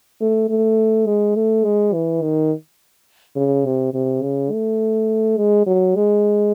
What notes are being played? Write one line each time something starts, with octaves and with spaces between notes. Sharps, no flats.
A3
A3
G#3
A3
G#3
E3
D#3
C#3
C3
C3
C#3
A3
G#3
F#3
G#3